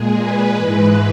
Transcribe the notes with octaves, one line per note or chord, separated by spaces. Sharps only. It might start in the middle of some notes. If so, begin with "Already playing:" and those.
Already playing: A#2 G#3 G#4
B4
G#2 E3 G#3 B4